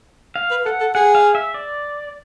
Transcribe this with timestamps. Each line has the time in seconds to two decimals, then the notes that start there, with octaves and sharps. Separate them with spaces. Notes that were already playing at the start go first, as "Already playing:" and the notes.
0.36 F5
0.51 B4
0.65 A4 F#5
0.81 A4
0.95 G#4 F#5
1.15 F5
1.35 E5
1.54 D5